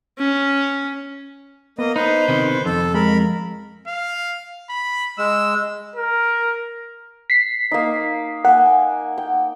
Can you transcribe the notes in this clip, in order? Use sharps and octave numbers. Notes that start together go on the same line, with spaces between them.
C#4
A#3 B3 D#5
D#4 B4 C5
C3 D#3
F2 A4
G#3 A#4 B5
F5
B5
G#3 E6
A#4
B6 C7
A#3 D#4
A#3 F#5 G#5
G5